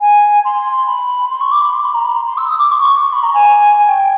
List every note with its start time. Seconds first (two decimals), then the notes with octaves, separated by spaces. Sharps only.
0.01 G#5
0.44 C6
0.87 B5
1.30 C6
1.40 C#6
1.51 D6
1.61 B5
1.72 C6
1.83 B5
1.94 A#5
2.04 B5
2.16 C6
2.26 C6
2.37 E6
2.48 D#6
2.58 D6
2.72 C6
2.80 C#6
3.01 C#6
3.12 B5
3.23 A#5
3.33 G#5
3.87 G5